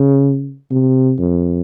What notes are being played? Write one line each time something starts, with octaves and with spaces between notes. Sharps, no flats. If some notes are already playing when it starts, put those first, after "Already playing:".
Already playing: C#3
C3
F2